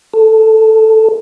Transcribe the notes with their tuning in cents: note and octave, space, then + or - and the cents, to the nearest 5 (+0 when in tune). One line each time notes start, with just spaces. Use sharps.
A4 +0